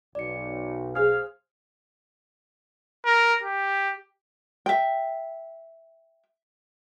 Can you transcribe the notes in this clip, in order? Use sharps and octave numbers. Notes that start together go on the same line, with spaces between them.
B1 D5 C#7
G#4 C5 F5 F6
A#4
G4
E5 G5